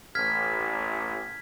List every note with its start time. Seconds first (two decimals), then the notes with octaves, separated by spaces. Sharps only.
0.15 A1 F6 G#6 B6